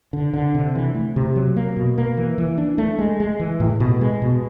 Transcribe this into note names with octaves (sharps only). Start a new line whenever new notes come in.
D3
D3
C3
E3
A3
C3
F#3
A#3
B2
A#3
E3
E3
D4
A3
G#3
G#3
E3
A2
B2
G#3
B2